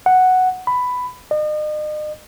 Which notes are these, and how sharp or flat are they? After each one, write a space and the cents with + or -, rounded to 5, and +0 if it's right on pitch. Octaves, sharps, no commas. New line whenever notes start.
F#5 +0
B5 +10
D#5 -40